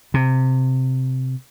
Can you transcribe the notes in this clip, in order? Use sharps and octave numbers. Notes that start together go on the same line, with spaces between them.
C3